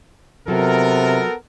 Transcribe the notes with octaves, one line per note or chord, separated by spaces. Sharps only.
C3 F#3 B3 F4 A4 A#4